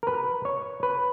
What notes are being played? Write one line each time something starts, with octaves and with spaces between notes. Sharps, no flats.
A#4
B4
C#5
B4